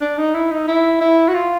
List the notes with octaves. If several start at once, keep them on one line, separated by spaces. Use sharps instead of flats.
D4
D#4
E4
D#4
E4
E4
F#4
F4